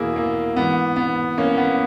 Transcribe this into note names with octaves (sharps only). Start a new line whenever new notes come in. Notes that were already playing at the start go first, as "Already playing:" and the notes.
Already playing: E2 B2 A#3 E4 G#4
A#3
G#2 E3 B3
B3
A#3 C#4
B3